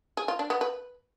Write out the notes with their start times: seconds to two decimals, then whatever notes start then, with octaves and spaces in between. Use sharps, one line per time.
0.17 G#4
0.28 F4
0.39 D4
0.50 B3
0.61 B4